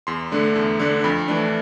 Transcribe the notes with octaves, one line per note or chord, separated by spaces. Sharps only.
E2 C6
D3 A3 D4
E2
D3 A3 D4
F2 B5
E3 A3 D4